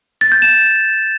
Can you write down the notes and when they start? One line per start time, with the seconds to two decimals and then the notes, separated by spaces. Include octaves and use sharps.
0.21 A6
0.32 G6
0.42 E7